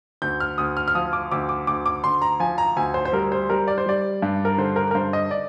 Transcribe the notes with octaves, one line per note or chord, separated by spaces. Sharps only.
D2 G6
F6
D2 D#6
F6
F6
F3 D#6
D6
D2 D6
D6
D2 D6
D6
D2 C6
A#5
F3 G#5
A#5
D2 G#5
C5
C5
G3 A#4
C5
G3 A#4
D5
C5
G3 D5
G2
A#4
D3 C5
A#4
A#4
G2 C5
D#5
D5